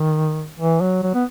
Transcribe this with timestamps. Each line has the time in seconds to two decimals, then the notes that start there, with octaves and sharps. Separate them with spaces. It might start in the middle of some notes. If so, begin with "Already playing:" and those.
Already playing: D#3
0.59 E3
0.81 F#3
1.03 F#3
1.14 B3